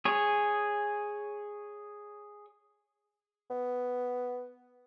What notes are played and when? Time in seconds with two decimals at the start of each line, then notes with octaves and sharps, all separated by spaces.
0.05 G#4 C#5
3.50 B3